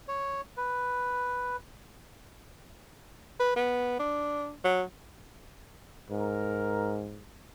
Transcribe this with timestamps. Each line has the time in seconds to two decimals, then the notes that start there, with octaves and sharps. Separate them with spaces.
0.08 C#5
0.57 B4
3.40 B4
3.56 B3
3.99 D4
4.64 F#3
6.10 G#2 A#4